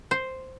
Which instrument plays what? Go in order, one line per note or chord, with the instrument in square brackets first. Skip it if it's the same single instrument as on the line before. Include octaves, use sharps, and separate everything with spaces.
[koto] C5